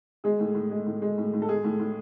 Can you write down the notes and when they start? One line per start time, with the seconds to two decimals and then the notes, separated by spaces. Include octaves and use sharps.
0.24 G#3 G#4
0.40 A2
0.55 A2
0.71 G#3
0.87 A2
1.02 G#3
1.18 A2
1.34 A2
1.42 A4
1.49 G#3 G#4
1.64 A2
1.80 A2